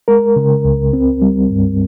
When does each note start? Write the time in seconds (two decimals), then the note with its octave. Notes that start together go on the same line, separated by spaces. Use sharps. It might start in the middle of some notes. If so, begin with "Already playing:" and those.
0.08 G#3 A#4
0.36 C#3
0.65 C#2
0.93 C4
1.22 G3
1.51 G2